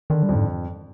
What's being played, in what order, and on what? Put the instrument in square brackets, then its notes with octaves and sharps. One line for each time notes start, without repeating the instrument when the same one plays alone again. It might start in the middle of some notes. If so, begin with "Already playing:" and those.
[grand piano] D3 [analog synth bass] D#3
[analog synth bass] G3
[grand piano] F2
[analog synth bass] G#2